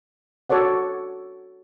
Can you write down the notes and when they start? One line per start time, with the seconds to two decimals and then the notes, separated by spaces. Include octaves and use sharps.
0.50 F#4 A4 C#5 D5 F#5